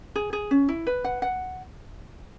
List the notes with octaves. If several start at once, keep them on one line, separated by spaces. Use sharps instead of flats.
G#4
G#4
C#4
E4
B4
F#5
F#5